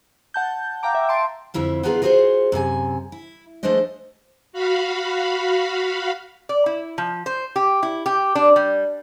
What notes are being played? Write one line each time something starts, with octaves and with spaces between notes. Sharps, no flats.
F#5 A5 G6
F5 G5 A#5 D6
E5
A5 C6 D7
F2 D3 E4 F4 E5
B3 D4 D#4 F4 G#4 B4
F4 F#4 G#4 A#4 C5 C#5
F#2 C3 G4 G#5
E4
F3 G#3 A3 D4 C5 D#5
F#4 F5 B5
D5
E4
F3
C5
G4
E4
G4
D4
G3